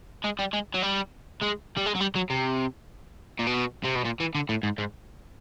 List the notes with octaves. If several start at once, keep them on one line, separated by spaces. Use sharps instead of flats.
G#3
G3
G#3
F#3
G3
G#3
G3
G#3
F#3
G3
F#3
C3
A#2
B2
C3
B2
A#2
E3
D3
A2
G#2
G#2